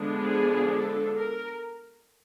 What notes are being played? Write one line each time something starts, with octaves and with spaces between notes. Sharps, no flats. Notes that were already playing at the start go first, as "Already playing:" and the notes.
Already playing: D3 F3 G#3 B3 D4
G#4
A4
A#4